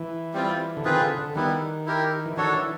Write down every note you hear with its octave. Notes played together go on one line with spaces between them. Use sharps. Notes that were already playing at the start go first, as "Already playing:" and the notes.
Already playing: E3
G3 C4 F4
D3
D#3 C4 F4 G#4 B4
D3
D3
D#3 G3 B3 E4
E4 G4 A#4
E3
D#3 D4 F#4 A4 C#5
E3